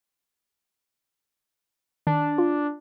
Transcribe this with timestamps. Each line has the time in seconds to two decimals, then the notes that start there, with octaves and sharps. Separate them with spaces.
2.07 D#3 D4
2.38 F4